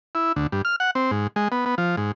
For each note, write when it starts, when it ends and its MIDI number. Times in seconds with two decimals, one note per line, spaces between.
0.15 0.32 64
0.36 0.47 38
0.52 0.62 43
0.65 0.76 89
0.80 0.91 78
0.95 1.11 60
1.11 1.27 44
1.36 1.48 56
1.52 1.66 59
1.66 1.75 59
1.78 1.96 53
1.97 2.12 44